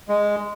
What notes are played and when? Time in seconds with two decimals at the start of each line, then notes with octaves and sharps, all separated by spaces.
0.09 G#3